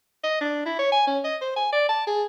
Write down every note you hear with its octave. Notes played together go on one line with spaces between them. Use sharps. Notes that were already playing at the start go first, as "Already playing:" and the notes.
D#5
D4
E4
C#5
G#5
C#4
D#5
C5
G#5
D5
A5
G#4